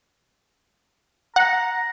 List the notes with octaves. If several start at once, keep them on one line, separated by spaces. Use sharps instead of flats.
F#5 A#5